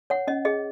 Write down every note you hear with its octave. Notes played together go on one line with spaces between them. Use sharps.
C#5 F#5
C#4 D#5
G#4 D#5